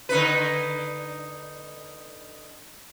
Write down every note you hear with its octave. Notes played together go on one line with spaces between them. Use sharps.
D3 D#4 B4